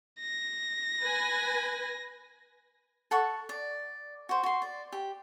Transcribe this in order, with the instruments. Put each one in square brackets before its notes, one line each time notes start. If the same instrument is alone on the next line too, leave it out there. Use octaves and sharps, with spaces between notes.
[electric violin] A#6
[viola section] B4 G#5
[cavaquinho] A4 F#5 C#6
D5
F#4 C5
F#4 C6
D5
G4